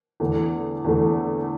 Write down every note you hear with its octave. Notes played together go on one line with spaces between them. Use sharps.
E2 D3 A3
E2 D3 A3